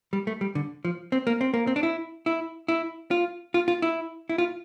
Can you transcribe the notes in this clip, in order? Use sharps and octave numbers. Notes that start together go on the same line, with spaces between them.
G3
A3
G3
D3
F3
C4
A#3
C4
A#3
C4
D4
E4
E4
E4
F4
F4
F4
E4
E4
F4